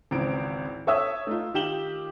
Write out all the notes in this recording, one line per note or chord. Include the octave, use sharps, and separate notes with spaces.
G#1 C#2 E3 C4 D7
A4 C#5 E5 D#6 E6
A3 D#4 F4
D#3 F4 G4 E7 F#7 G7